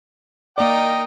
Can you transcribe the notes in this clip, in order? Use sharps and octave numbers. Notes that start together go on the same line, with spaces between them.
A#3 D#4 A#4 D5 D#5 G5